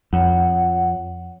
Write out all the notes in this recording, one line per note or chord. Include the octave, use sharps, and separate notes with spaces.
F2 C#5 F#5